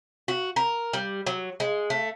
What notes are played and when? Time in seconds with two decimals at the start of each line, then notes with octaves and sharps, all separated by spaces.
0.28 F#4
0.56 A#4
0.93 G3
1.27 F#3
1.60 G#3
1.90 A3